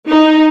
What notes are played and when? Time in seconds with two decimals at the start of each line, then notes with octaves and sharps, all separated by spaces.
0.10 D#4